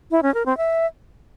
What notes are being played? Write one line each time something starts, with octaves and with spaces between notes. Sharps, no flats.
E4
C#4
A#4
C4
E5